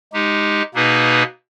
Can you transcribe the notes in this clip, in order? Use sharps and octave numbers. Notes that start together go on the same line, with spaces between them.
G#3 D#4 G4
B2 A#3 D#4 G#4 B4